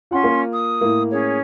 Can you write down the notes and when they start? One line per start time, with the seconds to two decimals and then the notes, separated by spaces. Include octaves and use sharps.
0.11 C#4 F4 F#5 C6
0.23 A#3 F4 A#4
0.52 D#6
0.81 A2 A#3
1.11 C#4 G#4 C#5